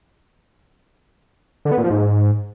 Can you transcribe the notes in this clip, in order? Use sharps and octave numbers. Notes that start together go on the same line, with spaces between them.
D3
B3
A#2
F3
G#2